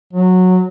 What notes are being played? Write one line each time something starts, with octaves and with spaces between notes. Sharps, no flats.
F#3